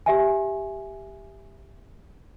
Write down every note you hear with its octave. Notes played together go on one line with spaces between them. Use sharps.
G4 E5 G#5